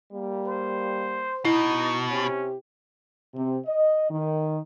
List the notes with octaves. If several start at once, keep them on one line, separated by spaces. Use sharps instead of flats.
G3 A#3
C5
B2 D#4 E4
C3 C#4 G4
C3
D#5
D#3